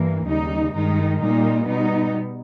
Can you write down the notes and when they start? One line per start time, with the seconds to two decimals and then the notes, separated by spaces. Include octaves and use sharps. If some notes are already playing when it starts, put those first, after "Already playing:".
Already playing: G2 E3 A#3
0.28 D#2 C#3 G3 D#4
0.75 G2 D#3 G#3 D#4
1.22 A#2 G3 A#3 D#4
1.68 B2 G3 B3 D#4